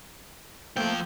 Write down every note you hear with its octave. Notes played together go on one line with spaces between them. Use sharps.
F3 A3 A#3 C4 G5